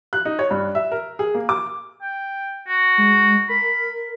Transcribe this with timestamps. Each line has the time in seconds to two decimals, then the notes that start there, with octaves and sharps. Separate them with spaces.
0.13 F#6
0.25 D#4
0.39 C#5
0.51 G2
0.75 E5
0.92 A#4
1.19 G#4
1.35 A#3
1.49 D6
2.01 G5
2.68 F#4
2.98 G#3
3.49 A#4 B5